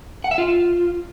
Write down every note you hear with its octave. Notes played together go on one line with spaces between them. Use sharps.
F#5
E5
F4